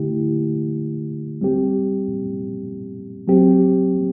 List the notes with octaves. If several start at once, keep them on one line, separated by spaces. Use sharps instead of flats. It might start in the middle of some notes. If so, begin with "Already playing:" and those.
Already playing: D3 A3 E4 G4
G3 C4 G4
F#3 C4 G4